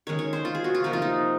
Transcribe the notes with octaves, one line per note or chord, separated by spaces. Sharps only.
D#3 G#3 C#4 C#5
C#5
C5
F4
G#4
F#4
F4
C3 F3 A#3 D#4
F4
D#4